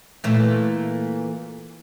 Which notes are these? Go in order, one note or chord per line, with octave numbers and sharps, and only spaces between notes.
A#2 E3 A3